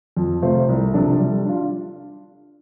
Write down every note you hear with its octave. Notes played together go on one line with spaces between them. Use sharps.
F2
C3 A3 F4 C5
C2
C3 F3 D4 A4
G3
D4 F4